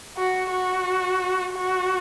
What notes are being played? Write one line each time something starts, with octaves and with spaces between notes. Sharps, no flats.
F#4
F#4
F#4